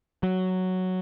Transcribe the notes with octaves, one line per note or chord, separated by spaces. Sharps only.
F#3